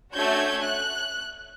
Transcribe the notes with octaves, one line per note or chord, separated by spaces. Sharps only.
A3 C#4 D4 F#4 G6 G#6
F#6